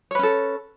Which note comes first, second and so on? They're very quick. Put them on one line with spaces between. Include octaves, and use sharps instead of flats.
C#5 B4 C#4 A4